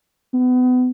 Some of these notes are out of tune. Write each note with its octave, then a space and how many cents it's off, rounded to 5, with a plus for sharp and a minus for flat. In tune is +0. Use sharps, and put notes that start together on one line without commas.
B3 +30